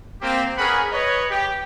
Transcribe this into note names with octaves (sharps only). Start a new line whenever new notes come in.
A#3 C4 G4
C#4 G#4 A#4 B4 F#5 B5
B4 C#5 D#5
G4